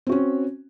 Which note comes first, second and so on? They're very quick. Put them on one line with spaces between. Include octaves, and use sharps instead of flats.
C4 F#4 C#4